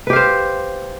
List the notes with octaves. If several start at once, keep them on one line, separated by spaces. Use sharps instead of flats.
G4 B4 C5 F5